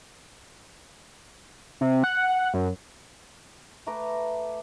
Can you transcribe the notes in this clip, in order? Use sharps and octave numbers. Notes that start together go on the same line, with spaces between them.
C3
F#5
F#2
A3 B4 A#5 D6